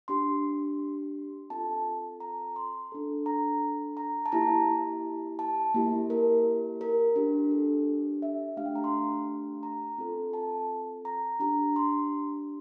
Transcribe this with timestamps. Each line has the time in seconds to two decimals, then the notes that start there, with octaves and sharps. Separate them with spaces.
0.08 D4 G4 C6
1.50 C4 F4 A4 A5
2.20 A#5
2.56 C6
2.92 D4 A4
3.26 A#5
3.97 A#5
4.26 A5
4.32 A#3 E4 G4 A#5
5.39 A5
5.74 A#3 E4 G4
6.10 A#4
6.81 A#4
7.16 D4 G4
7.52 A4
8.22 E5
8.57 A3 D4 G4 F5
8.66 G5
8.75 A#5
8.84 C6
9.63 A#5
9.98 C4 F4 A4
10.33 A5
11.05 A#5
11.40 D4 G4 A#5
11.76 C6